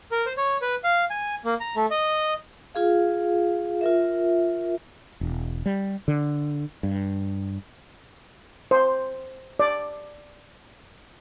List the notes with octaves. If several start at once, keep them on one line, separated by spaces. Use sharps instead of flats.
A#4
C5
C#5
B4
F5
G#5
A#3
A#5
A3
D#5
F4 G#4 F5
F4 A#4 E5
E1
G3
D3
G2
C5
D5